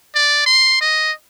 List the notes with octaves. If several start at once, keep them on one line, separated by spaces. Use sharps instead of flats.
D5
C6
D#5